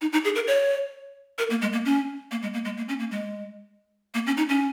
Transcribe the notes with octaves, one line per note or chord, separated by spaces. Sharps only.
D#4
D#4
G#4
A#4
C#5
A#4
A#3
G#3
A#3
C#4
A#3
G#3
A#3
G#3
A#3
C#4
A#3
G#3
A#3
C#4
D#4
C#4